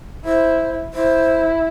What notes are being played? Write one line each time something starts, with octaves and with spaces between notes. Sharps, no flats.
E4 C5
E4 C5